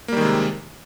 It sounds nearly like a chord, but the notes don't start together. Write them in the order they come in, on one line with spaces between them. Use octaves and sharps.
A#3 G3 D#3 G#3 C3